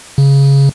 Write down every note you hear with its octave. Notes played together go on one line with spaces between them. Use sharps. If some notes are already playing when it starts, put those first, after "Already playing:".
C#3